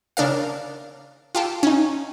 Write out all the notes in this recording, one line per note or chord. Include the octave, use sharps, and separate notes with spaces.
C#3 D4 A#4 F5
F4 G4 A4
C#4 D#4